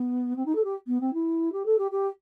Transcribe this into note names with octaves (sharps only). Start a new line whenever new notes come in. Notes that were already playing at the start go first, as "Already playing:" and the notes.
Already playing: B3
C4
D#4
A4
G4
B3
C4
E4
G4
A4
G4
G4